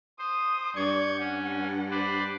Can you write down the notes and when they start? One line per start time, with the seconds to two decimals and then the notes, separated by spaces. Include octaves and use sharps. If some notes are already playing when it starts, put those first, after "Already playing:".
0.19 C5 D#6
0.76 G2 D5 C#6 G6 G#6
1.20 C#4 F#5
1.91 B4 C5 D5